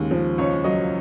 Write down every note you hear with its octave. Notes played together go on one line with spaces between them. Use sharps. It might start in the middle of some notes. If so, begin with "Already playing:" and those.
Already playing: D#2 C#3 G#3
F3
C#2 C#5
F#3 D#5